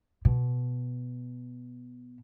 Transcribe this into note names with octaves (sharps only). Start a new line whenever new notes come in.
B2